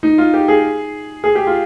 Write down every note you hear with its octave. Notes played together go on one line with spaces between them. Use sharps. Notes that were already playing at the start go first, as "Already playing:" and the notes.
D#4
F4
G4
G#4
G#4
G4
F4